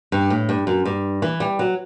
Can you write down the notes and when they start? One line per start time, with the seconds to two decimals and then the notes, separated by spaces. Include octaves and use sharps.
0.12 G2
0.30 A2
0.49 G2
0.67 F#2
0.85 G2
1.22 E3
1.40 G3
1.59 F#3